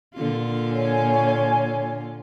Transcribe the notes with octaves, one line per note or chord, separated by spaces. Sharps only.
A#2 D3 F4
C#5 G#5